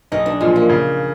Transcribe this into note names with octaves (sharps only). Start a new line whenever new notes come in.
B1 D#4
D4
A#2 F3 G#3
A#3
C#3